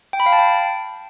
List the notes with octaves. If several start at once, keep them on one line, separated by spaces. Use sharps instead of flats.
G5
B5
F5
A5
G5